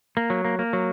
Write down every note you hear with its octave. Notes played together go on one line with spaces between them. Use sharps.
A#3
F#3
A#3
A#3
F#3